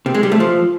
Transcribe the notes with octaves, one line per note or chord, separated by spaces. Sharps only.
C3
G#3
G3
A3
F3